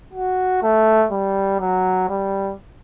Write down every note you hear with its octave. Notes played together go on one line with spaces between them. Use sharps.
F#4
A3
G3
F#3
G3